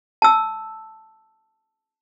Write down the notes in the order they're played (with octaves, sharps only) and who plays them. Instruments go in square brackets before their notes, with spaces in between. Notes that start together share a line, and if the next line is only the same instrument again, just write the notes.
[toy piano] A5 E6